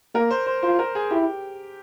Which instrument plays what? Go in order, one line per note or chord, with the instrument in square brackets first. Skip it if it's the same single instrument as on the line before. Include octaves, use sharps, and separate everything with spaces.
[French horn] A#3 [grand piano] A#4
[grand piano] C5
C5
[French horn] F4 [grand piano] C5
[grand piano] A#4
G#4
[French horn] E4 [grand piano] G4